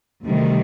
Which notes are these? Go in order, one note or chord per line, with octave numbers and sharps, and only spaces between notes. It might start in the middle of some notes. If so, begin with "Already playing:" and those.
D2 C3 D#3 G3